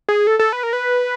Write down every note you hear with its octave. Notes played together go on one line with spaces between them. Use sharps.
G#4
A4
A4
B4
A#4
B4